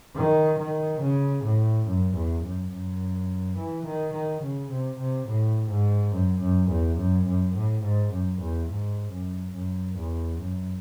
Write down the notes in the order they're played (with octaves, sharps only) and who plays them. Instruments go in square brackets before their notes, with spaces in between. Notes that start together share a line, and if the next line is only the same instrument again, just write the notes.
[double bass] D#3
D#3
C#3
A2
F#2
E2
F#2
F#2
E3
D#3
D#3
C#3
C3
C3
A2
G#2
F#2
F#2
E2
F#2
F#2
A2
G#2
F#2
E2
G#2
F#2
F#2
E2
F#2